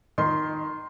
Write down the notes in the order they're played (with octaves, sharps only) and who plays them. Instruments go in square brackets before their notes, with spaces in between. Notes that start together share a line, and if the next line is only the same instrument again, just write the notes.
[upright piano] D#3 C6